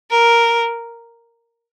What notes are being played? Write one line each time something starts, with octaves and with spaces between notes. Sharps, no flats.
A#4